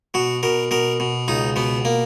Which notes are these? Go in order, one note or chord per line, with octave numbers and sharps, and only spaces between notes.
B2 F#4
B2 A#4
B2 A#4
B2
C#2 D#4
B2 B3
A#3